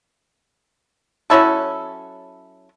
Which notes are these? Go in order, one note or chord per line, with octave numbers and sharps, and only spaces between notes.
F#3 C#4 E4 A4